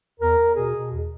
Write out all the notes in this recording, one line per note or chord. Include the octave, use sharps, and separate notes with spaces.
E2 A#4
E2
B2 G#4
B2
E2